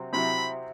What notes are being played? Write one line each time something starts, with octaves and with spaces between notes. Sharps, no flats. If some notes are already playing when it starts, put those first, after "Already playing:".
Already playing: C3 F#3 C4
C3 F#3 C4 E4 B5